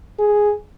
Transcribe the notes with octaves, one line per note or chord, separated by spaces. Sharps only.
G#4